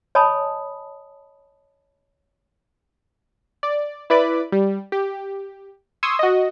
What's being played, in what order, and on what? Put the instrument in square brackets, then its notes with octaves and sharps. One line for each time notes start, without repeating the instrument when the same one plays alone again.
[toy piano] C#5 D#5 G#5 A5 B5 D#6
[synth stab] D5
E4 B4 D5 B5 D6
G3
G4
C6 C#6 D#6 E6 G#6
F#4 D#5